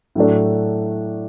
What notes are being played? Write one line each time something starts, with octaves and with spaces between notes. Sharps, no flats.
A2 F#3 A3 D4